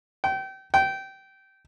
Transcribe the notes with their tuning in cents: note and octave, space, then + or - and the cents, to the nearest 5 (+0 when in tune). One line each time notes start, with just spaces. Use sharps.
G5 -30
G5 -20